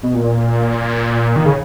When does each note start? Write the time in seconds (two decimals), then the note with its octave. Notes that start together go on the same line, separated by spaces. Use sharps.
0.03 B2
0.14 A#2
1.36 D#3
1.45 C#3